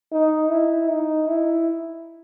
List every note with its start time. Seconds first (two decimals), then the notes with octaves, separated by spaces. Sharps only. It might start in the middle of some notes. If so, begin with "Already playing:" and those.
0.12 D#4
0.50 E4
0.90 D#4
1.29 E4